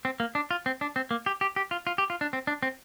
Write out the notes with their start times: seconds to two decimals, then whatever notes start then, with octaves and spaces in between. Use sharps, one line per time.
0.05 C4
0.20 A#3
0.35 D4
0.51 F4
0.66 C4
0.81 D4
0.96 C4
1.11 A#3
1.26 G4
1.41 G4
1.56 G4
1.71 F4
1.87 F4
1.98 G4
2.10 F4
2.21 D4
2.33 C4
2.47 D4
2.63 C4